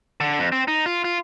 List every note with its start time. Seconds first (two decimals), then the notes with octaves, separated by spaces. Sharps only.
0.20 D3
0.39 F2
0.52 C4
0.68 D#4
0.86 F4
1.04 F4